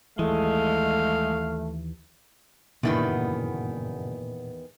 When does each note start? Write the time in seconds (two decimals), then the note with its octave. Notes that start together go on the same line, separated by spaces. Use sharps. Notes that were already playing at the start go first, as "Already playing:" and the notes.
0.19 D#2 E3 G#3 A3 F5
2.83 F#1 E2 G2 A#2 D3 D#3 B3 E4